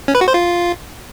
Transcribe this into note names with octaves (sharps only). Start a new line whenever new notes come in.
C#4
B4
F#4
C5
F4